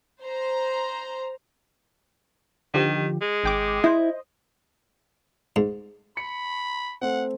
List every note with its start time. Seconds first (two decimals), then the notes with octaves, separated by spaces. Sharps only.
0.25 C5 A#5
2.74 D3 D#3 F3 G4
3.21 G#3
3.44 G#1 G5 D6
3.84 E4 C5 D#5
5.56 G#2
6.17 B5 C#7
7.01 A3 C4 F#5